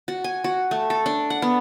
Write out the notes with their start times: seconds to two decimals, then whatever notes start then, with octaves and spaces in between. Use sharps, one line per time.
0.08 F#4
0.24 G#5
0.44 F#4
0.71 A3
0.90 A4
1.06 D4
1.30 F#5
1.42 B3